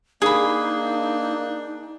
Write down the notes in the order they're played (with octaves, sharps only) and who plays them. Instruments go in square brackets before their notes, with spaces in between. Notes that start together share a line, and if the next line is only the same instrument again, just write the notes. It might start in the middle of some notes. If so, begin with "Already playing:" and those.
[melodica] A#3 [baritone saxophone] D4 [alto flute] D#4 [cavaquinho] G#4 B5